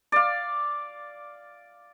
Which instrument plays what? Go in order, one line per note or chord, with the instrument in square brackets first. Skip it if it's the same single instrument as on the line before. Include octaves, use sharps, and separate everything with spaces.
[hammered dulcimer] D5 F5